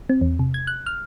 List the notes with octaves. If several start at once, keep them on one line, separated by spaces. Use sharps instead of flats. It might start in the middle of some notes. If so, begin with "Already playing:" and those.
C4
E2
C3
G#6
F#6
F6